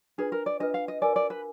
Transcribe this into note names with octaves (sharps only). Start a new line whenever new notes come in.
D4 F4 G#4 B4
A#4
D5
D4 F4 B4 D#5
F5
D#5
F#4 A#4 D5 F5 G#5
D5
B4